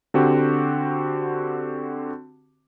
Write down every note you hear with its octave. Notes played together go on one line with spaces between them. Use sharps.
D3 C4 F#4 G4